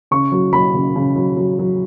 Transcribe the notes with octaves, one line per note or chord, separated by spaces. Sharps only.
C#3 C#6
F#3
F#3 B5
C#3
C#3
F#3
F#3
F#3